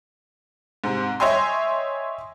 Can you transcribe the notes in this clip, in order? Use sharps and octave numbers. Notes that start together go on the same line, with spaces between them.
G#2 C3
C#5 D#5 E5 G5 G#5 C6